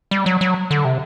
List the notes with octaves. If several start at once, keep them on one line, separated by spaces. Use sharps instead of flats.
G3
F#3
F#3
D3
C3